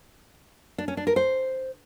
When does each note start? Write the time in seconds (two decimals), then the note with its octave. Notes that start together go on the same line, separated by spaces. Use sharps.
0.78 D4
0.88 C#4
0.97 D4
1.07 A#4
1.16 C5